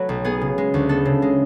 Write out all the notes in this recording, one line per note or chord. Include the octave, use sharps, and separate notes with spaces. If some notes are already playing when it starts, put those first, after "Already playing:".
Already playing: F#3 A3 F#4 B4 C#5
B1
B3 G#4
C#3
G#3
D2
B3 A4
C#3
G#3